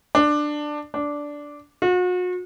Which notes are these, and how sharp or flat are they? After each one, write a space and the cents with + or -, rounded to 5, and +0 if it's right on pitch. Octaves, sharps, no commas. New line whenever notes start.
D4 +15
D4 -5
F#4 -40